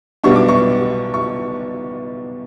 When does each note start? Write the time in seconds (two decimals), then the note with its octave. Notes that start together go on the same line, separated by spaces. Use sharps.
0.24 B1 B2 G3 B3 D4 C#6
0.36 D6
0.48 C#6
1.14 C#6